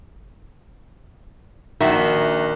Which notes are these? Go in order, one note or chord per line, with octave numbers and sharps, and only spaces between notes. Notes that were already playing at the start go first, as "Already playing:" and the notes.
A#1 D#3 F#4 E5